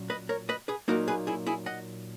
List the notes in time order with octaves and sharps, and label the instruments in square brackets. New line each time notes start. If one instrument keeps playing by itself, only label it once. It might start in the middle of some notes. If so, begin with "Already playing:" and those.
Already playing: [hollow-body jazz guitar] A#2 F#3 C#4
B4 D#5
A#4 C#5
B4 D#5
G#4 B4
A#2 F#3 A#3 D#4 F#4 A#4
G#4 B4
E4 G#4
E4 G#4
D#5 F#5